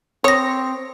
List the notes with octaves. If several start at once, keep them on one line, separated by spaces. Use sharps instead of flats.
C4 C#5 D#6 A#6